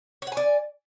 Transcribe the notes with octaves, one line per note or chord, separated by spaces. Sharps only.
C#5 D5 F#5 G#5